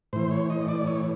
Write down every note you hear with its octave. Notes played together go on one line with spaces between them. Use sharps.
A2 E3 C5
C#5
D#5
D5
C#5